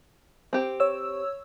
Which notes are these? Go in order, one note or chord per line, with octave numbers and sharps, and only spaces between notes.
C4 G4
C#5 E6